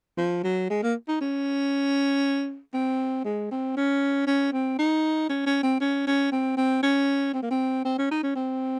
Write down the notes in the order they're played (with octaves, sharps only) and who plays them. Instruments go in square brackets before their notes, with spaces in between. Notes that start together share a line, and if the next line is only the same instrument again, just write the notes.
[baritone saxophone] F3
F#3
G#3
A#3
D#4
C#4
C4
G#3
C4
C#4
C#4
C4
D#4
C#4
C#4
C4
C#4
C#4
C4
C4
C#4
C4
A#3
C4
C4
C#4
D#4
C#4
C4